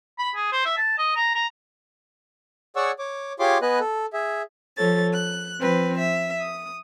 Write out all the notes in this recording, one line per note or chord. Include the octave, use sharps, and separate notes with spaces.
B5
G#4
C5
E5
A5
D#5
A#5
A#5
G#4 C#5 D5 F#5 C#6 E6
C#5 D6
F4 G4 G#4 C#5 C6 D6
B3 B4 D#5 G#5 F#6
A4
G#4 E5
F3 A4 C#5 A6
F#6
F3 C4 B4
E5
D#6